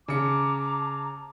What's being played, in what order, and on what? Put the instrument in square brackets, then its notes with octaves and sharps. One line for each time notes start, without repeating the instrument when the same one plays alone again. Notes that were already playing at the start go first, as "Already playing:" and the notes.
[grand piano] C#3 C#7 [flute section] A5 A#5 D6